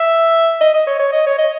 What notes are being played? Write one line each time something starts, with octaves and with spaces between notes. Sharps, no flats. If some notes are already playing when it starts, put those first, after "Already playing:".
Already playing: E5
D#5
D#5
C#5
C#5
D#5
C#5
D#5